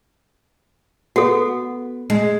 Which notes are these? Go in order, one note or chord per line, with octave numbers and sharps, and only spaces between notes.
B3 F#4 A4
G#3